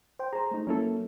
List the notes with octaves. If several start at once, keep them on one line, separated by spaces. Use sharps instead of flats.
C5 G5
G#4 C5 A#5
A3 D#4
F#3 A#3 C#4 E4 A4